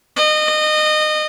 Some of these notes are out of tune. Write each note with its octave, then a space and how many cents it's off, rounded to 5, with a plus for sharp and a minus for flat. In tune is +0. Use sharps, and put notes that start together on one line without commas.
D#5 -25